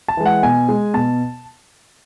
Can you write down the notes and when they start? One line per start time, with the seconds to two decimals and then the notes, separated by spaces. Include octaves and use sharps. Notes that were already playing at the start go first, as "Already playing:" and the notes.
0.08 A5
0.17 E3 G#3
0.26 F#5
0.43 B2 G#5
0.68 G#3
0.94 B2 A5